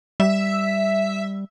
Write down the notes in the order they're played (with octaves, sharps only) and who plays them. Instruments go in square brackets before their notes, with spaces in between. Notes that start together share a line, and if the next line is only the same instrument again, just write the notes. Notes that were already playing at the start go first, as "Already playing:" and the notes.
[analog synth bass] G3 [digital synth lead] E5